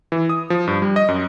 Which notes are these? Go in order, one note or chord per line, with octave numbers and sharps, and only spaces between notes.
E3
D#6
F3
G2
G3
D#5
F#2